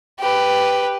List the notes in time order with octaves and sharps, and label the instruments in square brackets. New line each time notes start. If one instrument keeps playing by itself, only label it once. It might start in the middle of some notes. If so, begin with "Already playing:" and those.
[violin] G4 B4